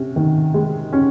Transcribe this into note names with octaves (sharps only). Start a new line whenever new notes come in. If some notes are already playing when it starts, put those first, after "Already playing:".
Already playing: C3 C#4
D#3
G#3
C#4